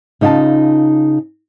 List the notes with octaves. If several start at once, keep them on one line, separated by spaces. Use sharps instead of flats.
C#3 D#4 F4 F#5 A5